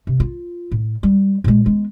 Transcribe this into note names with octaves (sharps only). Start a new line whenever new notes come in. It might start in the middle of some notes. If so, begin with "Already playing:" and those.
C3
F4
A2
G3
A#2 G#3
G#3 B3